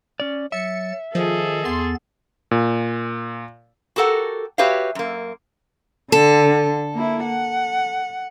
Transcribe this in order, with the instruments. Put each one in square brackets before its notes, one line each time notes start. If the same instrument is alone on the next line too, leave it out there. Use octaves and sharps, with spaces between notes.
[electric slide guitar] C#4 D5
[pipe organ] F#3 A6 [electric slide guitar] E5 [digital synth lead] C#7
[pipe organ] D#3 D#5 [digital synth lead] F3 [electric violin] G#4 A4
[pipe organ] E2 B3 A6 [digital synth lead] C6
[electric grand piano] A#2
[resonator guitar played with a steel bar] F#4 G4 A4 A#4 F#5
F#4 G4 B4 C#5 E5 F5
F#2 A#3
[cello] D3 [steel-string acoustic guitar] A4
[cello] A#3 E4
F#5